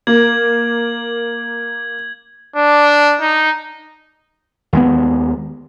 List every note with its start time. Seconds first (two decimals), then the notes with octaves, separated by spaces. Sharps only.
0.07 A#3 G#6 F#7
2.56 D4
3.21 D#4
4.73 D#2 G#3 B3